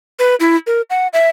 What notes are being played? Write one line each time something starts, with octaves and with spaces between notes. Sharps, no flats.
B4
E4
A#4
F#5
E5